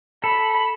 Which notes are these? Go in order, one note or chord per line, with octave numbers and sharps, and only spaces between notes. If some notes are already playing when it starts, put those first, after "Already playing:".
A4 B5